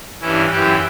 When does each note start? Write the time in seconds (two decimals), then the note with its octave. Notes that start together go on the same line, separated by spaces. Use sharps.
0.21 G2 E3 C#4 E4
0.51 F#2 E3 E4 G4